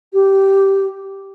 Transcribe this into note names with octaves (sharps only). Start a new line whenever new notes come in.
G4